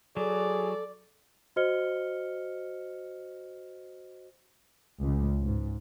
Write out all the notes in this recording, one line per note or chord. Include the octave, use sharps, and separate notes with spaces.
F#3 G#4 A4 D5
F#4 C5 D#5 F6 C#7 G7
C#2
G#2